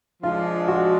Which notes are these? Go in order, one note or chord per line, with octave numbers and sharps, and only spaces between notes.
F3 G#3 D4 F4
F#4